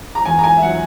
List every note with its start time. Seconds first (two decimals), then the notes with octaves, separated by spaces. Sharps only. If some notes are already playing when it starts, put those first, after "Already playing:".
0.15 A#5
0.25 E2 G#5
0.39 A#5
0.44 G#5
0.57 E5
0.62 F#3 F#5